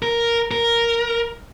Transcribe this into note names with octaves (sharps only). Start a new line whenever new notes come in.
A#4
A#4